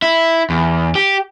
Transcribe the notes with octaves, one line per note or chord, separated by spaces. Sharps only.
E4
E2
G4